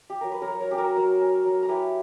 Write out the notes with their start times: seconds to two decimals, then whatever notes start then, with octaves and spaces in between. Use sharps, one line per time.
0.10 G4
0.21 F#3 A#4
0.32 B4
0.42 A#4 C#5
0.48 F#3
0.60 A#4 C#5
0.71 C#4 G4
0.78 F#4 A#4
0.96 F#3 F#4 A#4
1.21 C#4
1.45 F#3
1.63 A#4
1.68 E4 G4 B4